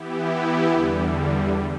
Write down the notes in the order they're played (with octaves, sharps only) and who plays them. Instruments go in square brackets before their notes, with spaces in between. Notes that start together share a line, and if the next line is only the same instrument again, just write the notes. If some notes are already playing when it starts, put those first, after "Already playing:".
Already playing: [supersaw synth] E3 B3 E4 G4
E2 D3 G3